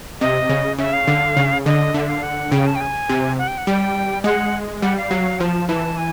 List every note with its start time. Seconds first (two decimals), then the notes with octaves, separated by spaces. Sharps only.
0.21 C3 D#5
0.49 C#3
0.79 C#3 E5
0.93 F5
1.07 D3
1.37 C#3
1.65 D3 D#5
1.94 D3 E5
2.08 F5
2.23 F#5
2.51 C#3 G5
2.67 A5
2.76 G5
2.81 G#5
3.09 C3
3.38 F#5
3.48 G5
3.58 F#5
3.67 G3 G5
4.24 G#3 F#5
4.82 G3 F#5
4.97 F5
5.11 F#3
5.39 F3 A5
5.69 E3 A5
5.97 G#5